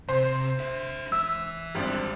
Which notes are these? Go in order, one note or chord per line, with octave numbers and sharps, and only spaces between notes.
C3 C5
D4 E5
E3 E5 E6
G#1 G3 C4 D4